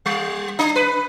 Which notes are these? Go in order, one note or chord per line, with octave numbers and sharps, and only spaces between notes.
G3
D4
B4